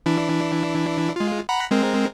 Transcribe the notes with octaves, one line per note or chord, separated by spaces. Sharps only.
E3 D4 E4
G#3 F4
F#5 A#5 B5
G#3 C4 A#4